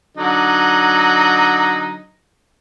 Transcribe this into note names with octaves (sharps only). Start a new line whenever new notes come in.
D3 F#3 D#4